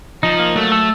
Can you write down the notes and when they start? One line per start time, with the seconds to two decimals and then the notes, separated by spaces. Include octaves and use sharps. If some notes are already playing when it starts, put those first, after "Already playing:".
0.23 F3 D#4
0.39 A#3
0.56 F#3 A3
0.72 A4